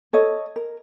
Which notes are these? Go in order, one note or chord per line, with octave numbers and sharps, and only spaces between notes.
A4 C#5 D#5
A#4